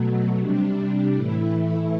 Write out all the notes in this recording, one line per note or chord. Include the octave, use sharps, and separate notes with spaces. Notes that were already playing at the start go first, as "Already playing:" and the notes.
Already playing: B2 F#3 A3
C3 G3 D4
A2 E3 A3 E4